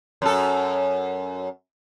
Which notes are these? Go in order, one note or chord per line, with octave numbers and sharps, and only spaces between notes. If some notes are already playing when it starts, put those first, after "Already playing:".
F#2 A4